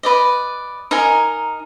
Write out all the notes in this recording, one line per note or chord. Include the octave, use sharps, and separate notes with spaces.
B4 D5 D#5
D#4 A#4 D#5 G#5